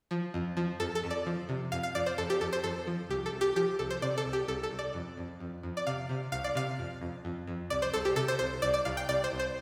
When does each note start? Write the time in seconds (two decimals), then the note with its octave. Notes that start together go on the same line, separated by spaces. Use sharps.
0.11 F3
0.34 F2
0.57 F3
0.80 F2 A4
0.95 A4
1.03 F2
1.11 D5
1.26 F3
1.49 C3
1.72 F2 F5
1.83 F5
1.95 F2 D5
2.06 C5
2.18 F2 A4
2.30 G4
2.41 F2 A4
2.53 C5
2.64 F2 A4
2.87 F3
3.10 C2 G4
3.26 A4
3.33 C2
3.41 G4
3.56 F3 G4
3.79 C2 A4
3.90 C5
4.02 C3 D5
4.18 A4
4.25 C2
4.33 G4
4.48 C2 A4
4.63 A4
4.71 C2
4.79 D5
4.94 F2
5.17 F2
5.40 F2
5.63 F2
5.77 D5
5.87 C3 F5
6.09 C3
6.32 C2 F5
6.44 D5
6.55 C3 F5
6.79 F2
7.02 F2
7.25 F2
7.47 F2
7.70 C2 D5
7.82 C5
7.93 C2 A4
8.05 G4
8.16 C3 A4
8.28 C5
8.39 C2 C5
8.62 C2 D5
8.74 D5
8.85 C2 F5
8.97 G5
9.09 C2 D5
9.24 C5
9.32 C2
9.39 C5